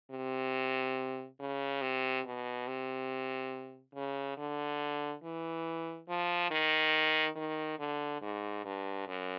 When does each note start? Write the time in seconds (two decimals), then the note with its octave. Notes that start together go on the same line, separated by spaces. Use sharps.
0.12 C3
1.40 C#3
1.82 C3
2.26 B2
2.68 C3
3.95 C#3
4.38 D3
5.24 E3
6.09 F3
6.51 D#3
7.36 D#3
7.79 D3
8.22 G#2
8.65 G2
9.08 F#2